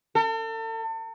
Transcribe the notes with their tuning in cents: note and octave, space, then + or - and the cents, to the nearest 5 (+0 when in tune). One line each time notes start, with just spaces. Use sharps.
A4 +40